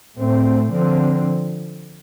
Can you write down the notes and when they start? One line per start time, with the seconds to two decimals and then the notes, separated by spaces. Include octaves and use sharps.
0.16 A2 A3 C4
0.70 D3 F3 C4